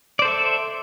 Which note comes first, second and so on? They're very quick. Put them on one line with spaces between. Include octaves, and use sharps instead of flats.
D5 C5 A4 E5